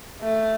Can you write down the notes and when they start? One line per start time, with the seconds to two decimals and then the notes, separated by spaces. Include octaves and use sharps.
0.23 A3